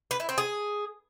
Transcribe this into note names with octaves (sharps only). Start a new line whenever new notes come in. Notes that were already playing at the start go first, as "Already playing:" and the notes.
B4
E4
C4
G#4